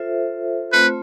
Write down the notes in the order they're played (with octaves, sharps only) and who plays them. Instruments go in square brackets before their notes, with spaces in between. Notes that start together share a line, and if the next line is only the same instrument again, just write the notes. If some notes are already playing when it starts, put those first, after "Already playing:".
Already playing: [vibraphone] F4 A4 C5 E5
[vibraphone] A3 C4 F4 C5 [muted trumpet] B4